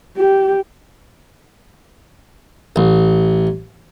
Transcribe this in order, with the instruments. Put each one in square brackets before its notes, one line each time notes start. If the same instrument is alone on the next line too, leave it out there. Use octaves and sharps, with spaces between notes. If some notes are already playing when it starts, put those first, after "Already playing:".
[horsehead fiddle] G4
[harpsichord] A1